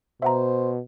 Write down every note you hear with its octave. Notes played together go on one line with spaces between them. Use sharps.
B2 C5 E5 F#5 A#5